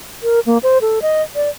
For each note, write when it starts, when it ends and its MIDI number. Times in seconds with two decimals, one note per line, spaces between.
0.23 0.40 70
0.46 0.58 58
0.63 0.78 72
0.81 0.99 69
1.02 1.22 75
1.36 1.50 74